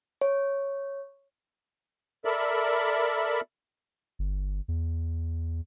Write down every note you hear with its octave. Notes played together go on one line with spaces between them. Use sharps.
C#5
A4 A#4 D5 E5 B5
G1
E2